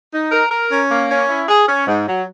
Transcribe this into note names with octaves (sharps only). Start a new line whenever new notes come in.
D#4
A#4
A#4
C#4
A#3
C#4
E4
G#4
C#4
G#2
F#3